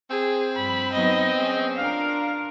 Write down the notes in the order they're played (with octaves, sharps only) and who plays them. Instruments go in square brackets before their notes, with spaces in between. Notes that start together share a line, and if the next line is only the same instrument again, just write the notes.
[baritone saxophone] C4 [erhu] G#4
[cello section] G2 F3 [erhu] B5
[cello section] F#3 B3 D#4 [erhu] D#5
[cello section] B3 C#4 G#4
[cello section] D4 F4 A#4 [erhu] F5